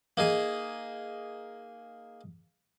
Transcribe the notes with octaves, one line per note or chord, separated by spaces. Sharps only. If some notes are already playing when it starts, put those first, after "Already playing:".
A#3 D#4 G#4